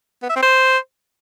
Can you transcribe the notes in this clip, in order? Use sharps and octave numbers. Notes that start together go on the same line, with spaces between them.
B3
E5
C4
C5